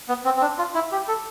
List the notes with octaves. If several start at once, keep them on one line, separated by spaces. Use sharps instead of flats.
B3
C4
C4
D4
F4
E4
G4
A4